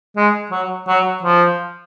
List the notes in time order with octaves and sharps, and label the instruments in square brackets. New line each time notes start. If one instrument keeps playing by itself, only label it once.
[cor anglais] G#3
F#3
F#3
F3